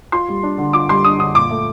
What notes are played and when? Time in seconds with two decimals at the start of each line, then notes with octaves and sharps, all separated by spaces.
0.12 F4 C6
0.28 G3
0.43 D4
0.58 D3
0.73 F4 D6
0.89 G3 C6
1.04 D4 D#6
1.19 D3 D#6
1.35 A#2 D6
1.50 A3